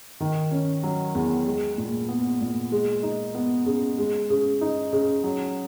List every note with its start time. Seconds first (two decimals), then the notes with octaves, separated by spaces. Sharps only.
0.20 D#3
0.51 C#4
0.83 F#3
1.15 E2
1.47 G#3
1.78 A#2
2.09 B3
2.40 A#2
2.72 G#3
3.03 D#4
3.35 B3
3.66 C#3
3.98 G#3
4.30 C#3
4.61 D#4
4.93 C#3
5.24 F#3